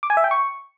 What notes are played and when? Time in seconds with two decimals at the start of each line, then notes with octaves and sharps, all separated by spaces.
0.03 D6
0.10 G#5
0.17 E5
0.24 G5
0.31 C#6